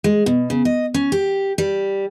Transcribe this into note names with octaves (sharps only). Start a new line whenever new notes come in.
G#3
B2
C#3
D#5
C#4
G4
G3